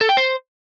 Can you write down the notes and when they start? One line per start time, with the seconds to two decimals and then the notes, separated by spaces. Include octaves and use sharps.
0.01 A4
0.09 G5
0.17 C5